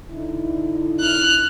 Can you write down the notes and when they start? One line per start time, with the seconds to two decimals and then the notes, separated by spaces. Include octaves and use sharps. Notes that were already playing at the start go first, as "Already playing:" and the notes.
0.12 D3 D#4 E4
0.99 F6 F#6